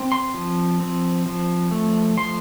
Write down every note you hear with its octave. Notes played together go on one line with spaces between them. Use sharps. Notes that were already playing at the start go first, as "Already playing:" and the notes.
Already playing: C4
C6
F3
C4
F3
A3
F3 C6